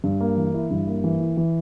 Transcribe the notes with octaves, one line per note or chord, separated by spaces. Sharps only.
G2
A#3
E3
E4
G2
A#3
E3
E4
E3